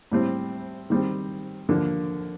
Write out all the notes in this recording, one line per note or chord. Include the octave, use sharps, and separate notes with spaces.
A2 G3 C4
D#3 G3 C4
D#2 D3 F3 A#3 D4